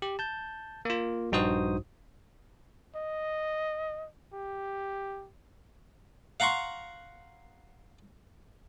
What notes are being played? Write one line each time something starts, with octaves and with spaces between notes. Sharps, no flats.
G4
A5 G6
A#3 F4
A#1 G2 D#4 F#4 C5 D#6
D#5
G4
F5 F#5 A#5 C6 C#6